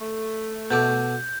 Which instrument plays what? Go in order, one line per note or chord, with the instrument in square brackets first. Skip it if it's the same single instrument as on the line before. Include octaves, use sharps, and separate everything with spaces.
[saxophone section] A3
[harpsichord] B2 A4 D6 [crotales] G6